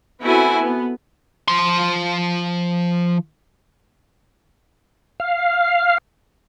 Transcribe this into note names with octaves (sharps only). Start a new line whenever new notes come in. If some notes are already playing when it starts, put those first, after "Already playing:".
B3 C4 E4 F#4 A4 G#5
B3
F3 C6
F5